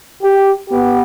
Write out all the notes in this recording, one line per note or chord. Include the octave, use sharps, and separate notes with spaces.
G4
B3 G4